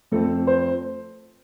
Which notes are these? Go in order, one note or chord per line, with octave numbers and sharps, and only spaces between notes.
F2 F3 A3 C4 A4
C5